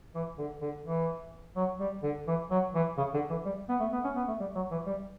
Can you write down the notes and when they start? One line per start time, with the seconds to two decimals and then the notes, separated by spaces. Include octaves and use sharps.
0.15 E3
0.38 D3
0.62 D3
0.85 E3
1.56 F#3
1.80 G3
2.03 D3
2.27 E3
2.51 F#3
2.75 E3
2.98 C#3
3.14 D3
3.30 E3
3.45 G3
3.69 B3
3.80 A3
3.92 B3
4.04 C#4
4.16 B3
4.28 A3
4.40 G3
4.55 F#3
4.71 E3
4.86 G3